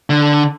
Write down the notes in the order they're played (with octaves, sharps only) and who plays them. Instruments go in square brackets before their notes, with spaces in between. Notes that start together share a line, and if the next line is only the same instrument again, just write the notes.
[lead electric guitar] D3